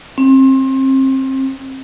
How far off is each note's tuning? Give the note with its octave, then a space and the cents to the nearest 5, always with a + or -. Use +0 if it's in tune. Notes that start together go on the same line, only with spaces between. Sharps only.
C4 +30